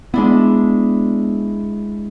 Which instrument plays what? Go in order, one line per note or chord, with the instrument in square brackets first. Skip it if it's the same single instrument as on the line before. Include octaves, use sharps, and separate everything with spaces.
[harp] G#3 D4 E4 [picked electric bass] B3